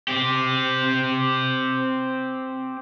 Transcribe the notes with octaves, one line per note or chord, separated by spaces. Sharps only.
C4 G4